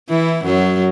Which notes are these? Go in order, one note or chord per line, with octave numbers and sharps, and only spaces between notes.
E3 E4
F#2 F#3